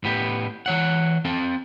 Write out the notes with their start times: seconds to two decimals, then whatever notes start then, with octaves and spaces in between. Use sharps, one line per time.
0.04 A2 B3 G4
0.66 E3 C#5 F#5
1.25 C4 A4 A5